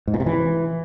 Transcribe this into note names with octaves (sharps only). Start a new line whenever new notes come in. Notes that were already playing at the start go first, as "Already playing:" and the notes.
G#2
A#2
C3
E3